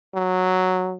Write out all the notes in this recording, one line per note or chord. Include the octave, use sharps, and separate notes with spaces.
F#3